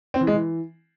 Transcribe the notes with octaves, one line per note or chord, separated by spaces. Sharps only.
C4
E3
G#3
E3